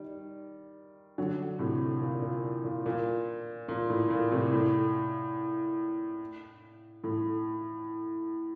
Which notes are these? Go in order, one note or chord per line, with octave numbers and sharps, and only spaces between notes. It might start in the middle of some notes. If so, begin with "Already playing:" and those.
Already playing: D#3 G3
D3 F#3
A2 C3
A#2
A#2
A#2
A#2
A#2
A2
A#2
A2 C3
A2
A2